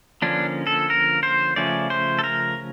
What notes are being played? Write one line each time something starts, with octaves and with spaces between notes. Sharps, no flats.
D3 F3 A#3 C#4 D4
A4
A#4
C5
C#3 F3 A3 C#4 D5
C5
A4
A#4